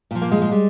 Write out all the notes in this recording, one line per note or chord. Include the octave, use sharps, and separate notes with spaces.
A#2 F3
A#3
G#3
G#3
G3